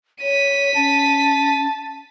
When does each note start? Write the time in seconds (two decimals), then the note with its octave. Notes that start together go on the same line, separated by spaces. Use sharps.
0.22 C#5 B6 D#7
0.76 C#4 A5